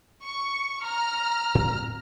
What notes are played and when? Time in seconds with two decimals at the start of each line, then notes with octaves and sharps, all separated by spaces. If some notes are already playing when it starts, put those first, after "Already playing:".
0.22 C#6
0.83 A#5 F6
1.55 A2 C4